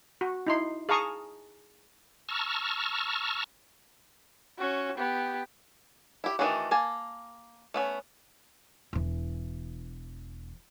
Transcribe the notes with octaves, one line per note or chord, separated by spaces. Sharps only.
F#4
D#4 E4 C6
G#4 F5 A5 A#5 C#6 D#6
A5 A#5 C#6 E6 F6
C#4 F#4
B3 G4
E4 G4
D#3 E3 A3 D4 F#4
A#3 G#5 A5
A3 B3 C#4
E1 E3